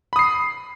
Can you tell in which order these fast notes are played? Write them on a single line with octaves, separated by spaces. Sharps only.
B5 D#6 C7